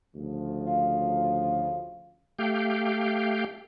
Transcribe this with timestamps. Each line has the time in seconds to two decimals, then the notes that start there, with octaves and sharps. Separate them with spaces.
0.15 D2 C#3 F3
0.66 F4
2.39 A3 G4 F5 G5